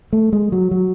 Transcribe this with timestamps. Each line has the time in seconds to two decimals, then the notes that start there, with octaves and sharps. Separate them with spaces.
0.13 A3
0.33 G#3
0.52 F#3
0.71 F#3